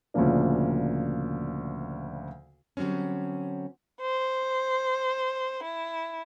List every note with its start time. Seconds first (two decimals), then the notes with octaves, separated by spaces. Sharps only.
0.14 D2 A#2 C#3 F3 A#3 D4
2.77 D3 F#3 G3 C4 C#4
4.02 C5
5.63 E4